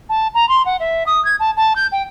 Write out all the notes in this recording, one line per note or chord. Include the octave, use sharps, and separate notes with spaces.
A5
A#5
C6
F#5
E5
D#6
G#6
A5
A5
G6
G5